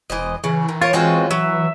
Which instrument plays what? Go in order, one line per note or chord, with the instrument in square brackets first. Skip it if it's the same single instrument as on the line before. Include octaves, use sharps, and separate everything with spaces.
[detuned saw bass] E1 [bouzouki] E3 C5 D#5
[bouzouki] C#3 [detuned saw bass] E3
[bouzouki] D#3
[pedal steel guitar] F4 [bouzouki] A#4 C#5
[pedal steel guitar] G#3 C4 [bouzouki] C#4 F4 F#4
[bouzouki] F#3 [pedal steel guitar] E5